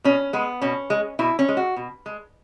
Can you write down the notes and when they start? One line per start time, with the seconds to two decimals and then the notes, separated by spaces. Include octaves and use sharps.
0.04 B2 C#4
0.33 G#3 B3
0.62 B2 C#4
0.90 G#3
1.19 B2 E4
1.39 C#4
1.49 G#3
1.57 F#4
1.76 B2
2.06 G#3